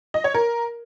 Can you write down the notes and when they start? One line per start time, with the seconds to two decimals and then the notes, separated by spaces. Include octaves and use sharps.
0.14 D#5
0.24 C#5
0.34 A#4